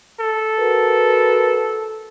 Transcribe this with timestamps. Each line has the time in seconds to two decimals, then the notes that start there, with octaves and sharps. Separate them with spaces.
0.20 A4
0.59 F#4 A#4 B4